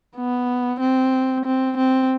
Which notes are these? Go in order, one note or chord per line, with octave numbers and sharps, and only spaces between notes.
B3
C4
C4
C4